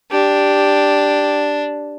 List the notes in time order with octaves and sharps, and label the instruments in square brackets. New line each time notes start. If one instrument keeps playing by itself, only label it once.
[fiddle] D4 [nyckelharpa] G4